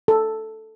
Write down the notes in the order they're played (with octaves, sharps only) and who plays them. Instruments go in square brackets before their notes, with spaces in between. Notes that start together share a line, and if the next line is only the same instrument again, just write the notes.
[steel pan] A4